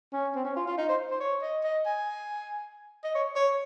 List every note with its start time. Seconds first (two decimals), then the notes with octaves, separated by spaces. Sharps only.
0.13 C#4
0.35 C4
0.45 C#4
0.56 F4
0.67 F4
0.78 D#4
0.89 C5
1.11 C5
1.20 C#5
1.42 D#5
1.64 D#5
1.86 G#5
3.04 D#5
3.15 C#5
3.36 C#5